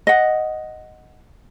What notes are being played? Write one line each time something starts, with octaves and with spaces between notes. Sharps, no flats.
D#5 F#5